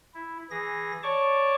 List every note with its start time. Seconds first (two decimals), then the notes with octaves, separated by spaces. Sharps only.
0.14 E4
0.51 E3 G#4 A#6
1.03 C#5 D5 A5 C#6 D6